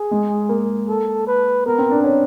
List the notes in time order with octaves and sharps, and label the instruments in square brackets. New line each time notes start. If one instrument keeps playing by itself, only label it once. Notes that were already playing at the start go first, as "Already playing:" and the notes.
Already playing: [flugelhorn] G#4
[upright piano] G#3
A#3
[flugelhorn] A4
B4
[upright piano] B3 [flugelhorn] A#4
[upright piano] C4
D4
C#4